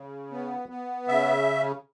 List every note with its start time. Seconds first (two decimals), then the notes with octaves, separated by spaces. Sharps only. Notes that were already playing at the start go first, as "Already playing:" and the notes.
Already playing: C#3
0.31 B3
0.69 B3
1.08 C#3 E5